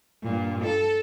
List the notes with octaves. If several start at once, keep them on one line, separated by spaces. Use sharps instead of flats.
G2 A#2
A4